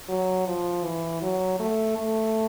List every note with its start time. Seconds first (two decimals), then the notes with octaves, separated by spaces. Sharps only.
0.09 F#3
0.47 F3
0.84 E3
1.22 F#3
1.59 A3
1.97 A3